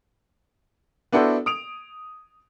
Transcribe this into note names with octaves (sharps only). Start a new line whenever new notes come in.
B3 D4 E4 F#4 A4 C5
D#6 D7 F7